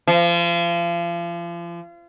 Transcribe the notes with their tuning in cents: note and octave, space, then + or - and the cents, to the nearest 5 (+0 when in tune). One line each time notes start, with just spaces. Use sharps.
F3 -35